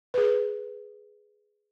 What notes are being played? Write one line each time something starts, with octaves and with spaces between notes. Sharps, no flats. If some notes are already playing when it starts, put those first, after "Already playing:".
G#4 B4